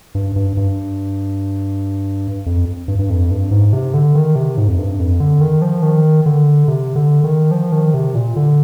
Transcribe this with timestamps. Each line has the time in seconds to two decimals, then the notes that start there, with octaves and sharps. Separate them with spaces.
0.15 G2
0.36 G2
0.57 G2
2.46 F2
2.88 G2
2.99 G2
3.10 F2
3.31 G2
3.51 G#2
3.73 C3
3.94 D3
4.15 D#3
4.36 C3
4.58 G#2
4.68 F2
4.78 G2
5.00 F2
5.20 D3
5.41 D#3
5.62 F3
5.83 D#3
6.26 D3
6.68 C3
6.95 D3
7.24 D#3
7.51 F3
7.72 D#3
7.94 C3
8.15 A#2
8.36 D3